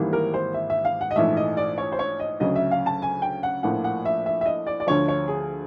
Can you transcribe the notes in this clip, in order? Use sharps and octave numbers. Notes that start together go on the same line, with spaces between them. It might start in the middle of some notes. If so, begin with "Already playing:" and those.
Already playing: G#1 G#2 E3 G3 A#3
A#4
C5
E5
E5
F5
F#5
D#5
A#1 G#2 E3 A3 E5
D#5
D5
C#5
C5
C#5
D#5
D2 C#3 F#3 D#5
E5
F5
A5
G#5
G5
F#5
A#1 A2 F3 A#3 F#5
F#5
E5
E5
E5
D#5
D5
D5
D2 D3 F3 C#5
C#5
G#4